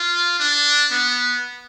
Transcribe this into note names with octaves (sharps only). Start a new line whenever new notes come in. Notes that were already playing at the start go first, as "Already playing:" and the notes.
Already playing: F4
D4
B3